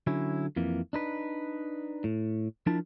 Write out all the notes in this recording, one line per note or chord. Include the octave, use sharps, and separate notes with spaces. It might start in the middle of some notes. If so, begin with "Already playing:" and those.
D3 F#3 C#4 E4
F2 E3 A#3
D4 D#4 B4
A2
F3 D4 E4 A#4 A5